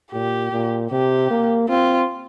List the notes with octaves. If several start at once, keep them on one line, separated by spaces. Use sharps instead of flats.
A#2 G4
A#2
C3 G4
A#3
C4 F4